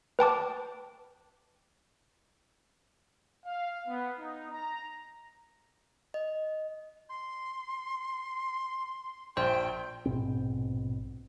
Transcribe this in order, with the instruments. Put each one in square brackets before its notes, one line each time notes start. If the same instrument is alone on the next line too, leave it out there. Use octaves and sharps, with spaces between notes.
[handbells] B4 G5 A5 D6
[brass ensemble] F5
B3
D#4
A#5
[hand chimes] D#5
[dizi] C6
[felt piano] A#1 [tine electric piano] C5 [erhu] G5
[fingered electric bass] A#1 G#2 B2 C4